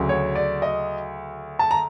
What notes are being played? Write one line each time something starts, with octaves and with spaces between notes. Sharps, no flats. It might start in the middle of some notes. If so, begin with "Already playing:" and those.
Already playing: D2 C#3 F#3
C#5
D5
D#5
A5
A#5